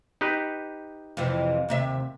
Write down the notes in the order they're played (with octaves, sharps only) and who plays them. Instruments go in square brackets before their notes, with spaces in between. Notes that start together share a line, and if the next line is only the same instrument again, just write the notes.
[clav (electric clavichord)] D#4 G4 B4
[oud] F2 C3 E3
D#2 C3 E5